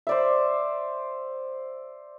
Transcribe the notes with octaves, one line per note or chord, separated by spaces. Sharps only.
C5 D5 E5